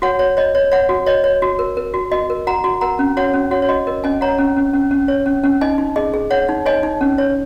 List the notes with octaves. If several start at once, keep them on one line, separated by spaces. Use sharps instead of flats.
F#4 C#5 F#5
C#5
C#5 D#5
C#5
C#5 F#5
F#4
C#5 D#5
C#5
F#4
A#4
A#4
F#4
F#4 D#5
A#4
F#4 F#5 A#5
F#4
A#4 F#5 A#5
C#4
F#4 C#5 F#5
C#4
F#4 C#5 F#5
C#5
F#4 D#5
A#4 D#5
C#4 D#5 G#5
C#5 F#5 A#5
C#4
C#4
C#4
C#4
C#5
C#4
C#4
D#4 D#5 G#5
D#4
G#4 D#5
G#4
C#5 F#5
D#4
C#5 D#5 G#5
D#4
C#4
C#5